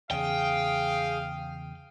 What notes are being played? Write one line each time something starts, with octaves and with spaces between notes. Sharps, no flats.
E2 C#3 G#4 F5 G5 D#6